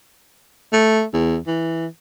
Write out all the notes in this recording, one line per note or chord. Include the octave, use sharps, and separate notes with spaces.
A3
E2
E3